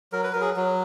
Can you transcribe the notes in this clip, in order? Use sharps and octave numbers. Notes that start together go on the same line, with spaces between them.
F#3 A#4
B4
F#3 A#4
G#4
F#3